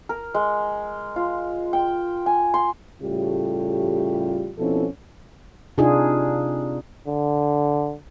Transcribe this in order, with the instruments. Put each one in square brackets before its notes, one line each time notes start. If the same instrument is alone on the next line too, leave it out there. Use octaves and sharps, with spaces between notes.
[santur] A#4
G#3
F4
G5
G#5
C6
[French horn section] A2 C#3 G3 A3 F4 G4
B2 F3 C4 C#4 E4 A4
[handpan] C3 D4 D#4 F4 G#4
[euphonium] D3